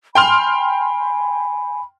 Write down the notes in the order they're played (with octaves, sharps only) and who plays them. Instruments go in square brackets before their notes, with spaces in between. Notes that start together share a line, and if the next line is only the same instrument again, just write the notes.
[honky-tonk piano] G5 C6 F6 [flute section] G#5 B5